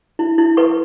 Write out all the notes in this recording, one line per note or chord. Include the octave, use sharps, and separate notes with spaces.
E4
E4
B4 C#6